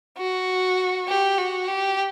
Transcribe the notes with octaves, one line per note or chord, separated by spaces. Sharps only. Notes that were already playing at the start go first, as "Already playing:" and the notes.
F#4
G4
F#4
G4